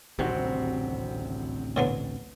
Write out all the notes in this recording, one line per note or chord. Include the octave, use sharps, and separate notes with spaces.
D#1 A1 D2 C3 C4 F#4
A2 D3 B3